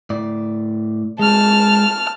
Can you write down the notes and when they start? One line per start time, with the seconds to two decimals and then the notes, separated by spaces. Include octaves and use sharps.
0.10 A2 D5
1.19 G#3 A5 F6